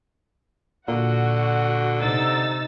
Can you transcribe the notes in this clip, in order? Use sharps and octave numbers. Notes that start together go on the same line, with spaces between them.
A#2 D3 F#4 F#5
C3 D#4 E6 A6